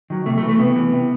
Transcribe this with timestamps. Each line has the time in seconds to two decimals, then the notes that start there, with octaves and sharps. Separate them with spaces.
0.10 D#3 F#3
0.26 C3 A3
0.37 A3
0.42 E3
0.49 A3
0.59 C3 B3
0.76 E3
0.92 C3